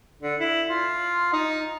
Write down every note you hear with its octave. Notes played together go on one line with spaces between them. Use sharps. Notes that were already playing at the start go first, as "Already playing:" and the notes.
D3
E4
F4
D#4